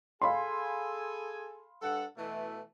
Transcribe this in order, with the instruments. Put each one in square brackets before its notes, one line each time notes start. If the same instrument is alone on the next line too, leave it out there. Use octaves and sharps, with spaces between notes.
[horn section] G#4 A4 G#5 [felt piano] F5 B5 C6
[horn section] G2 A4 F#5
B2 E3 A3